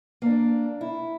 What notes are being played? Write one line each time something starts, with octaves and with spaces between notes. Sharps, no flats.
A#3 D4
E4